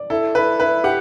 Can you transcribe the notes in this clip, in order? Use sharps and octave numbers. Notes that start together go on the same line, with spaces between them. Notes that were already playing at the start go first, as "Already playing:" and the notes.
Already playing: D5
E4 A4
E4 B4
E4 B4
G4 F#5